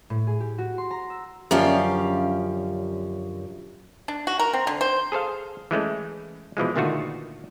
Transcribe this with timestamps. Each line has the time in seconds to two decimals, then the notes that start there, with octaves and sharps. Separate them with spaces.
0.10 A2
0.27 G#4
0.40 G4
0.58 F#4
0.78 C6
0.91 A#5
1.10 E6
1.51 F#2 D3 F3 C#4 G4 F5
4.08 D4
4.27 F#4
4.39 A#4
4.54 C4
4.67 D3
4.81 C5
5.12 G#4 A4 C5 F5
5.71 E3 G#3 A3 C#4
6.57 B2 E3 F3 G#3
6.76 A#2 D3 D#3 A3 F4 F#4